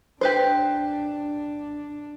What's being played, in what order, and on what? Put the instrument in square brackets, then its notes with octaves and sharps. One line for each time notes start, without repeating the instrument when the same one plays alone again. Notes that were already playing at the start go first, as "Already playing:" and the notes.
[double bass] D4 [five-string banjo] G4 B4 C5